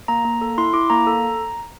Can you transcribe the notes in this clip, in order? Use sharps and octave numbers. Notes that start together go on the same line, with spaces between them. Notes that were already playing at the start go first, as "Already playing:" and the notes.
A#3 A#5
A#3
A4
E4 C6
E4 D6
A#3 A#5
A4